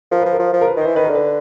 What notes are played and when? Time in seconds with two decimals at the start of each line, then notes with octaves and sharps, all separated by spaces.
0.11 F3 A#4
0.22 F3 B4
0.33 A#4
0.40 F3
0.53 F3
0.61 A#4
0.67 B4
0.77 D#3
0.81 C5
0.86 E3
0.96 D#3 B4
1.04 A#4
1.10 D3
1.15 B4